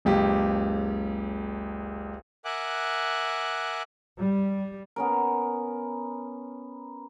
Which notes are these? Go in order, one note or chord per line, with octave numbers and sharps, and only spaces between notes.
F#1 C#2 G4
A#4 E5 F#5 G#5 D6 F#6
G3
B3 C#4 A#4